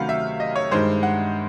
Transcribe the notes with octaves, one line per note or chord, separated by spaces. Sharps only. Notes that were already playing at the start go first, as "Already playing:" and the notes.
Already playing: C3 D#3 F#3 A3 C#4 F5 F#5 B5
E5
D#5
C#5
G2 D#3 G#3 C5
F#5